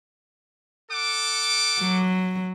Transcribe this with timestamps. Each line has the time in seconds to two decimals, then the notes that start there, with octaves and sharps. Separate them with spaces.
0.91 A4 F#5 D6
1.81 F#3